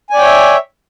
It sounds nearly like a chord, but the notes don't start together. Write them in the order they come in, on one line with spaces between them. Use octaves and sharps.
G#5 D5 G5 C#5 E5